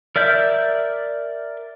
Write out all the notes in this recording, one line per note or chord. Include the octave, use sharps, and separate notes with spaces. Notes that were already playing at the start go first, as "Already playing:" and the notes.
A#4 D5 E5 G6